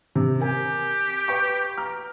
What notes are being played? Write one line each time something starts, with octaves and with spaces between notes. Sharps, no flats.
C3
G4 A#4 G#5
B4 G5 C#6
A#5 F6